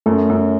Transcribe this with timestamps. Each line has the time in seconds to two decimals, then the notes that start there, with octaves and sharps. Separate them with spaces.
0.06 F#2 A3
0.30 F#2